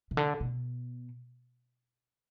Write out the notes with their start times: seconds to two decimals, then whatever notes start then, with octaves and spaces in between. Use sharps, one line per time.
0.11 C3
0.17 D3
0.40 B2